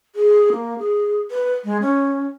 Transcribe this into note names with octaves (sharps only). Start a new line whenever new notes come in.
G#4
A#3
G#4
B4
G#3
C#4